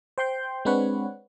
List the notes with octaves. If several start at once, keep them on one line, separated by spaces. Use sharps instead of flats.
C5 G5 C6 G6
G#3 C4 D4 B4 C#5 F#5